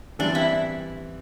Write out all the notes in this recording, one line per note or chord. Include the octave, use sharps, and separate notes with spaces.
E3 G3 C4 D4
E4